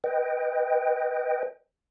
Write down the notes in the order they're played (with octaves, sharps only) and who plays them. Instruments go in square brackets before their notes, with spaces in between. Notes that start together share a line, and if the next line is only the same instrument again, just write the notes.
[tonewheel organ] B4 D#5 G5